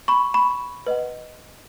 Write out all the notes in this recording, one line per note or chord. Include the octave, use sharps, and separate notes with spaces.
B5 C#6
B5 C#6
B4 D#5 F#5